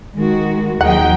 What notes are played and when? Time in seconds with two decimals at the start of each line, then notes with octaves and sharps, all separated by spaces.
0.15 D#3 G#3 F#4
0.81 D#2 F3 F#3 D#4 G#4 F#5 G5